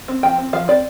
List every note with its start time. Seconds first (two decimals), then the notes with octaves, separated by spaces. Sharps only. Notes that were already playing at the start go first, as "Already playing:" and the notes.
0.08 C4
0.23 F3 G5
0.38 C4
0.53 F3 F5
0.68 C4 D5